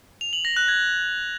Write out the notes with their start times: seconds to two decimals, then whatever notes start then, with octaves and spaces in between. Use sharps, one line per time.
0.21 F7
0.33 F#7
0.45 A#6
0.56 F#6
0.68 G#6